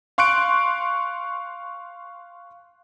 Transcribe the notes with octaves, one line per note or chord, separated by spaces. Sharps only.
F5 C6 C#6 F#6 C#7 D7